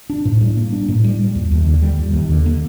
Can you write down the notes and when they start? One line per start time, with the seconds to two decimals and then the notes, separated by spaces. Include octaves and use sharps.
0.10 D4
0.25 A2
0.41 G3
0.57 A#3
0.73 D4
0.88 A2
1.04 G3
1.19 G3
1.35 D#2
1.51 D#2
1.66 D3
1.82 G3
1.99 D#2
2.14 D#2
2.30 D3
2.46 A#3